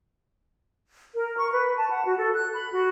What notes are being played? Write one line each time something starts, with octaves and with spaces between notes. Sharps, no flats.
A#4
C#6
B4
A5
F#5
F#4
A4
F#6
B5
F#4